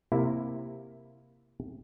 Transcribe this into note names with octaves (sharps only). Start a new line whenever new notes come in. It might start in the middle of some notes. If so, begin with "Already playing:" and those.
C3 A#3 E4